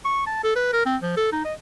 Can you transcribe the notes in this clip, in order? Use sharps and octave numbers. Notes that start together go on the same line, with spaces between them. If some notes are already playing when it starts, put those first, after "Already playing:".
C#6
A5
A4
B4
A#4
C4
F3
A4
D#4
D#5